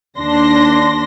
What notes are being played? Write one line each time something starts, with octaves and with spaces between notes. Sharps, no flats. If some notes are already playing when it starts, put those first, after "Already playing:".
D#2 D4 C6 A#6